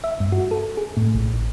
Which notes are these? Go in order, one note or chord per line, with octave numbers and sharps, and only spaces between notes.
E5
G2
F#4
A4
G#4
A2
A#1
A1